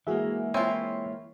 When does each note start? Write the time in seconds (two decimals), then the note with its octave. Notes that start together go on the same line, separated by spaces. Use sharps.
0.07 E3 G#3 A#3 F#4 G#4 E5
0.54 C4 E4 F4 C#5 G#5